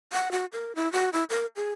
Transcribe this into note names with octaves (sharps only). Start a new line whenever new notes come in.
F#5
F#4
A#4
E4
F#4
E4
A#4
G#4